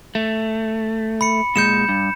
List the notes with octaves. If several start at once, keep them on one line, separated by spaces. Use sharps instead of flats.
A3
B5 C#7
A#2 G#3 G6 C#7 E7
G2